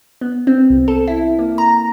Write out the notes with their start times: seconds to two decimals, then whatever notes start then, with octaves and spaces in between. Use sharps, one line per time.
0.21 B3
0.47 C4
0.70 C2
0.88 A4
1.08 E4
1.39 A#3
1.58 A#5